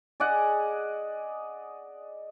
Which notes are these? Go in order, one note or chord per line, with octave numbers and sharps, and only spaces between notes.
G#4 D5 D#5 F#5